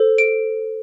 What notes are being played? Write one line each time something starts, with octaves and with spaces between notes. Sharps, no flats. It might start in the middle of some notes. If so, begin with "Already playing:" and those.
Already playing: A4 C5
D7